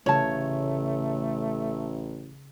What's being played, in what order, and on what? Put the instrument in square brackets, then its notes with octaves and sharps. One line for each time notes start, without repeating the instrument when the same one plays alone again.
[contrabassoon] A1 [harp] C#3 [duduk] A3 [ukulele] C#5 A5